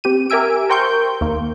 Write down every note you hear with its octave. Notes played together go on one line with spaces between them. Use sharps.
C4 G4 D#7
G4 A#4 E5 G#5 E6 D7
A#4 C5 G5 C6 C#6 G6
D#2 A#3